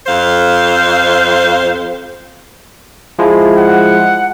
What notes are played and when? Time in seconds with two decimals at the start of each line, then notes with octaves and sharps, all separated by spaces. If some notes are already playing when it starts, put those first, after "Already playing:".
0.07 F2 C5 F5
3.19 F3 G#3 E4
3.57 F#5